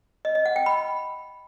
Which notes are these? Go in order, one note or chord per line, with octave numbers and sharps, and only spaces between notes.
D#5
D#5
F#5
G5
B5